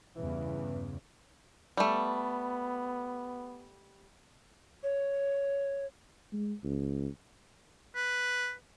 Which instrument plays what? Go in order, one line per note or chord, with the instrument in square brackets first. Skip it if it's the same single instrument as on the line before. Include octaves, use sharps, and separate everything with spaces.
[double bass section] E2 G2 C#3 [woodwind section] E3
[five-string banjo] G3 A3 [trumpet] B3
[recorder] C#5
[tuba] G#3
C#2
[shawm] B4